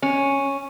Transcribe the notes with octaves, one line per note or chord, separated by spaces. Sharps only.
C#4